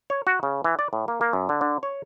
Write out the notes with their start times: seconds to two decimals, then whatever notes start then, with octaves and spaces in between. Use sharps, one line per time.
0.10 C#5
0.27 F#4
0.43 C#3
0.64 E3
0.79 D5
0.93 A2
1.08 A#3
1.21 A#3
1.33 F#2
1.49 D3
1.61 D3
1.83 C#5